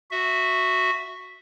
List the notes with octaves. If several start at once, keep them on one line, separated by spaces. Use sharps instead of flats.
F#4 E5